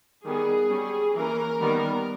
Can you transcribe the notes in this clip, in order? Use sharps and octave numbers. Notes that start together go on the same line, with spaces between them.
D#3 G3 B3 G#4
G3 C#4
E3 A#3 C#4 A#4
D#3 G3 B3